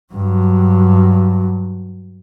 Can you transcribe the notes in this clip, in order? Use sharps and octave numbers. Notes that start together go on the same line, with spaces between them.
G2 F#3